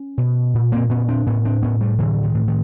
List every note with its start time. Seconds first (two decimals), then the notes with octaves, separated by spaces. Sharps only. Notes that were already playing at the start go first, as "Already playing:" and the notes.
Already playing: C#4
0.18 B2
0.54 A#2
0.72 A#3 C4
0.89 A#2 B3 C#4
1.08 C4 D4
1.27 A2 B3 C#4
1.45 C4 D4
1.62 A2 B3 C#4
1.81 G3 A3
1.99 A2 D3 E3
2.23 D#3
2.35 A2
2.48 D#3